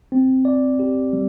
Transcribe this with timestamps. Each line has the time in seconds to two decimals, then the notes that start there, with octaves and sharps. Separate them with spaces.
0.12 C4
0.45 D5
0.79 G4
1.13 G3